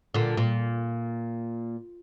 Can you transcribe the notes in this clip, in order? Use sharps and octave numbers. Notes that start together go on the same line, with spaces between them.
A#2 D3
A#2